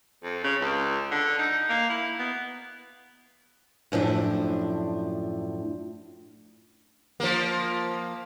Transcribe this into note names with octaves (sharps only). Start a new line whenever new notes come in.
F2
C#3
C#2
D3
D#4
A#3
E4
B3
F#2 A2 F3 D4
F3 A#3